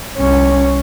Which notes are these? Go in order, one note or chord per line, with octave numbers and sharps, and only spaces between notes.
C2 C#4